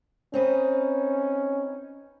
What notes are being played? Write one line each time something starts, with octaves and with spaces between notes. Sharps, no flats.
C4 C#4 D#4 B4